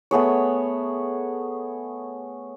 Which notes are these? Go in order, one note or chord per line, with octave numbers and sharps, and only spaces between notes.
A3 B3 G#4 C#5